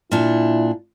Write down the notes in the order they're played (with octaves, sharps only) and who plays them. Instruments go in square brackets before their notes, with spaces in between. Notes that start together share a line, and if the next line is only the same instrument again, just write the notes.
[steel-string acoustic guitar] A#2 D4 [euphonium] E4